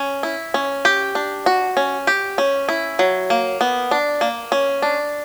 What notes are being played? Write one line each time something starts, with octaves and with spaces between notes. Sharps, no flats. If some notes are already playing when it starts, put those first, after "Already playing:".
Already playing: C#4
E4
C#4
G4
D4
F#4
C#4
G4
C#4
E4
F#3
A#3
B3
D4
A#3
C#4
D4